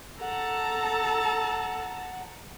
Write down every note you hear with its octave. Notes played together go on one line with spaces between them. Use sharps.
A4 F#5 A5 A#5